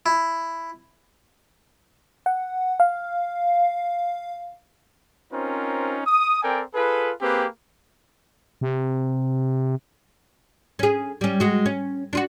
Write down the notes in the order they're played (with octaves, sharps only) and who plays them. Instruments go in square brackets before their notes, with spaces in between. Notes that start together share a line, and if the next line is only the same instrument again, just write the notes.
[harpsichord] E4
[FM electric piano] F#5
F5
[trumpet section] C4 C#4 D#4 F4 A#4 C5
D#6
C4 A4 A#4 D5 G5 G#5
F4 G#4 A4 B4
A#3 C4 G4 G#4 B4
[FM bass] C3
[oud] C#4 G#4
G3 C#4
G#3 F#4
C#4
D4 F4 F#4